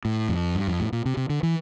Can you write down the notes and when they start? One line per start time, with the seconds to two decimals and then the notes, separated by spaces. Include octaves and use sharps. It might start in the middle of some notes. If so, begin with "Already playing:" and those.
0.05 A2
0.29 F2
0.55 G2
0.67 F2
0.80 A2
0.92 A#2
1.06 C3
1.17 C3
1.30 D3
1.43 E3